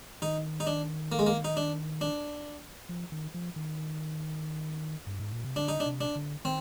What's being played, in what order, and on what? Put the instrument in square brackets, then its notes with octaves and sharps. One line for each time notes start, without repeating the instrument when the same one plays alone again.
[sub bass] D#3 [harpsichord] D#4
[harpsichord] D#4
D4
A#3
G#3
A#3
D#4
D4
D4
[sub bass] F3
D#3
F3
D#3
G2
G#2
A#2
C3
[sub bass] D3 [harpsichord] D4
[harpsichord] D#4
D4
[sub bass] C3
[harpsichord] D4
[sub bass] D3
[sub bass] D#3 [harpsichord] C4